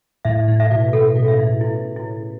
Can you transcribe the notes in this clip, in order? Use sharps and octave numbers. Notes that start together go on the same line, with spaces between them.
A2 E5
A2
E5
B2
C#3 A4
B2
E5
A2
E4
E4